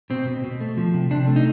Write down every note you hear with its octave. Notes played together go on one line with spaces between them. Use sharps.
B2 C4
B2
B2
A3
F3
C3
C3 D4
A3
D#4